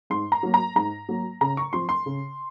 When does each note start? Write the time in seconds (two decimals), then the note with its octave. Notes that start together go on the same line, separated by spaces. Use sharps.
0.10 G#2 C6
0.32 A#5
0.43 F#3 A#3
0.54 A#5
0.76 G#2 A#5
1.09 F#3 A#3
1.41 C#3 A#5
1.57 C#6
1.73 F3 C4 C6
1.89 C6
2.06 C#3